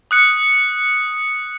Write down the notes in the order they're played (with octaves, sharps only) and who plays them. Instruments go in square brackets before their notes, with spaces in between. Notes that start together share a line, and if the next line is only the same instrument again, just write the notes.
[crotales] D#6 F#6 C#7